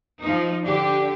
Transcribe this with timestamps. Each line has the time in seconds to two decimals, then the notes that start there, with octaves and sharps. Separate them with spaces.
0.21 F3 D#4
0.64 D3 D4 G4